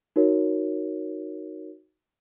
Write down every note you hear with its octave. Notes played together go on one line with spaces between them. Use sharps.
D#4 F#4 A#4 C#5